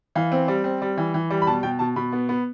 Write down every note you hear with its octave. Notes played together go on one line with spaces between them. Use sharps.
E3 F5
C4
G3
C4
G3
E3
E3
G3
B5
B2 A5
B2 G5
B2 A5
B2 B5
B3
B3